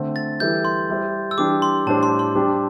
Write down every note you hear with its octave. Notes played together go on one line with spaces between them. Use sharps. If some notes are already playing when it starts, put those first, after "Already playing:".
Already playing: D3 A3 C4
A6
E3 G3 E4 A4 G6
C6
G3 E4 C5
E6
E3 G3 D4 G4 D6
C6
A2 G3 D4 G4 C5 A5
C6
C6
G3 D4 G4 C5